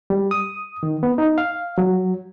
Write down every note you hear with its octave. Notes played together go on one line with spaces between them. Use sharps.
G3
D#6
D#3
B3
D#4
F5
F#3